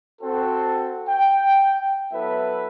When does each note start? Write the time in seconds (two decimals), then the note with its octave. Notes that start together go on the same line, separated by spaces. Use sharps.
0.22 C4 F#4 A4
1.08 G5
2.13 F#3 B3 E4 A4 B4 E5